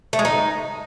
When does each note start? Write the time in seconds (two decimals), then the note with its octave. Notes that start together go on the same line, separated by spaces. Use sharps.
0.13 A3
0.19 G#3
0.25 D#4